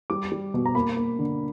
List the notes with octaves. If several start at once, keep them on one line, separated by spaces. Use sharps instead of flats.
G3 D6
G3
B2
A#5
A#3 B5
A#3
D3